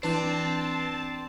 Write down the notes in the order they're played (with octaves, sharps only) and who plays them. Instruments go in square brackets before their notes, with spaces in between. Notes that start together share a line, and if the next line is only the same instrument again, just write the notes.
[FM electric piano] E3 B4 [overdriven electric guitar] C4 [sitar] D4 [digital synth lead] A5